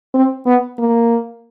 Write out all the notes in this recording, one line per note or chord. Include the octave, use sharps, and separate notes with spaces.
C4
B3
A#3